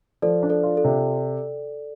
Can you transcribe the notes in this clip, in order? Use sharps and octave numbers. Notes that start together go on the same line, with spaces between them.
F3 A4 D5
D4
A4 D5
F4
A4
C3